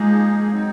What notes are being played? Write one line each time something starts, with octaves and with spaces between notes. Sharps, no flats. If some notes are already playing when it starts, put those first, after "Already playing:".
Already playing: F3 G#3 A#3 D#4 G#4
F#3 C4 D#4